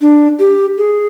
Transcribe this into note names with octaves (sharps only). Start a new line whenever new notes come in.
D4
G4
G#4